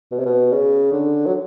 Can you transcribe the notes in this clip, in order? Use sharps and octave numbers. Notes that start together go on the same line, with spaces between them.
B2
C3
B2
C#3
D3
F#3